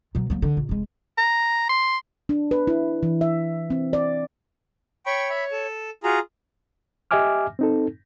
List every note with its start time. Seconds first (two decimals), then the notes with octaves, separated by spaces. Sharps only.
0.15 B2 F#3
0.30 F#3 A#3
0.42 D3
0.57 A#1
0.69 F1 G#3
1.18 A#5
1.70 C6
2.29 D4
2.51 B4
2.67 E4
3.03 E3
3.21 E5
3.70 C4
3.93 D5
5.06 C#5 G5 B5 C#6
5.30 E5 B5
5.52 A4
6.04 F4 F#4 G#4 A#5
7.11 G4 D#5 E5 G#5 D6 F6
7.59 C4 D#4 A4